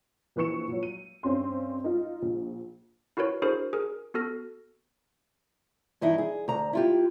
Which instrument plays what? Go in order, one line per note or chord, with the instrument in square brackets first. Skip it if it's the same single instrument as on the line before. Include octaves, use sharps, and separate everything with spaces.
[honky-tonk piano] A#1 E3 B4 C#6 C#7 E7
A#2 F#3
D#7
G2 C4 C#4 C6
D#4 F4
A#1
[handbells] E4 F#4 A#4 B4 C#5
D4 E4 F#4 G#4 A#4 C5
G#4 A#4
B3 F#4 A4 F6 A#6
[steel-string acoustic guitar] G2 E3 D#4 E4
G#4
D2 A#5
E4 F4 G4